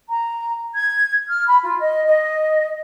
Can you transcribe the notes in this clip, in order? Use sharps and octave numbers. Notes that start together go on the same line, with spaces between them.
A#5
G#6
F6
B5
F4
D#5
D#5